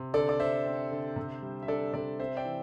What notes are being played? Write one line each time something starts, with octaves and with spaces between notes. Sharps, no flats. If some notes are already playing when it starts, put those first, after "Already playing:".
Already playing: C3
D3 A4 D5
D5
D3 C5 E5
C4
D3
C3
G3
E5
D4 A4 D5
C3 A4 D5
C4 C5 E5
D5 G5
E3